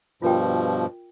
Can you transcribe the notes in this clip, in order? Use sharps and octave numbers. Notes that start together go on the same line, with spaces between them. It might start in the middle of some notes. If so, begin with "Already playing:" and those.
G2 B2 F3 F4 A#4 G5